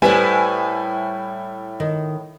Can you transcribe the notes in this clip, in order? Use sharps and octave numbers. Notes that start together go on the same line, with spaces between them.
A2 G3 E4 B4 C5 D5 G#5
D#3